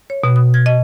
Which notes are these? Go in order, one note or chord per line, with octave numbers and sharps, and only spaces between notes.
C#5
B2
D#6
G#6
D#5